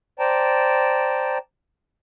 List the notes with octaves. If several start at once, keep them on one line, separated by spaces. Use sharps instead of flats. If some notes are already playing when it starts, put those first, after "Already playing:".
C5 D5 G5 A5 A#5